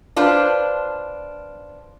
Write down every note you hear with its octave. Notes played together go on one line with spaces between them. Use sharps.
D4 F4 B4 C5